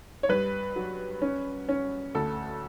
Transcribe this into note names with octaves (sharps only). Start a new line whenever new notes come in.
C#5
G2 B4
F#3
C#4
C#4
D2 A4